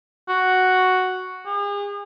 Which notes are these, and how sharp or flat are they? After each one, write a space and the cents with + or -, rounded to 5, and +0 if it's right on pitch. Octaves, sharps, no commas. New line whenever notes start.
F#4 +0
G#4 -40